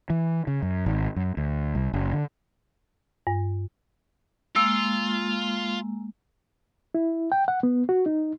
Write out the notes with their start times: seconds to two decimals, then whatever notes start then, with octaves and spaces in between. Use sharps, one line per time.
0.10 E3
0.47 C#3
0.62 F#2
0.86 G#1
1.16 F#2
1.37 D2
1.75 C2
1.93 F#1
2.13 D3
3.27 G2
4.56 G#3 A#3 F4 E6
6.95 E4
7.32 G5
7.48 F#5
7.63 B3
7.89 F#4
8.06 D#4